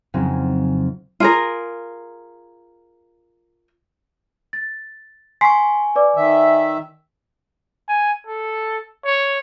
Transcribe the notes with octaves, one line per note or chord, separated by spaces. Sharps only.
F2 C#3 F#3 C4 C#4 D#4
F4 G#4 A#4
A6
G#5 C6 C#6 B6 C7
B4 D5 D6
D#3 E5
G#5
A4
C#5